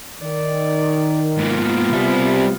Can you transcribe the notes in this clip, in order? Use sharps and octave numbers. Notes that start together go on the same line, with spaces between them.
D#3 D5
G#2 A#3 B3 F4
C3 G3 E5